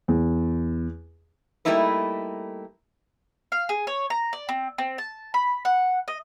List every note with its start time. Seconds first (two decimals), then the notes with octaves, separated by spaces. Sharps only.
0.08 E2
1.65 G3 A3 A#3 D#4 E4 B4
3.52 F5
3.69 G#4
3.87 C#5
4.10 A#5
4.33 D5
4.49 C4
4.78 C4
4.98 A5
5.34 B5
5.65 F#5
6.08 D#5